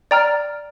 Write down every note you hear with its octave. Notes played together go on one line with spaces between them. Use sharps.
D5 G5 A#5 F6